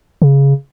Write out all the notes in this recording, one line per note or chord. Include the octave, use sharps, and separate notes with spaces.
C#3